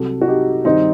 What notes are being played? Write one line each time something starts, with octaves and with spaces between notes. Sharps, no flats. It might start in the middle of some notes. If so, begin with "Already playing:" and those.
Already playing: C2 C3 F#3 F#4 A4
F#4
D#4 G4
G2 D#3 G3 C4 D#4